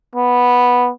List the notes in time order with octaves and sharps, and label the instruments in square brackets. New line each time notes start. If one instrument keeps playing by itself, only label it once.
[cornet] B3